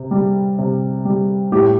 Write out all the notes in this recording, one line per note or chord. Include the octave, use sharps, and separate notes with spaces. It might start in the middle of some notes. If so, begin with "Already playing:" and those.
Already playing: C3
G3
C3
G3
A2 G4